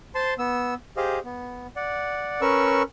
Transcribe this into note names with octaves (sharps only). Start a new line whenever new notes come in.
C5 A5 C6
B3 E6
G4 G#4 C5 D#5 F5
B3
D5 F#5
C#4 A#4 B4 C#6 E6